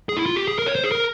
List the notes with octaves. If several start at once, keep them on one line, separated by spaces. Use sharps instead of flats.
G#4
E4
F4
G4
G#4
A#4
C#5
C5
G#4
A#4